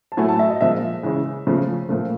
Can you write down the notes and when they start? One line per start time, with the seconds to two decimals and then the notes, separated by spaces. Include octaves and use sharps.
0.12 A5
0.17 A2 F#3 A3 G#5
0.28 A5
0.39 E5
0.50 D#5
0.61 A#2 F3 G#3 E5
1.03 C#3 E3 G#3
1.47 C#3 F3 A3
1.89 A#2 F3 A3